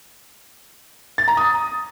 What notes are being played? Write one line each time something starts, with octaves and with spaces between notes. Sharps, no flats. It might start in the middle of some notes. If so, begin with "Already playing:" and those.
A6
A#5
D#6